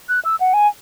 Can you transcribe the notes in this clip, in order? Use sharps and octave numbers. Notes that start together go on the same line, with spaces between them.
F#6
E6
F#5
G#5